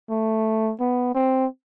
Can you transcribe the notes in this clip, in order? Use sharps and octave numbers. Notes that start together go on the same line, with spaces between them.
A3
B3
C4